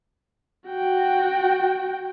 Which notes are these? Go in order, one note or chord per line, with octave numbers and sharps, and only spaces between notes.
F#4 G5